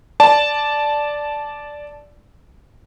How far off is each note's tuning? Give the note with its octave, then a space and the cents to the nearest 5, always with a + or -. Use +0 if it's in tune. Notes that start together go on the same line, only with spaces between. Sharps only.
D5 +0 A5 -10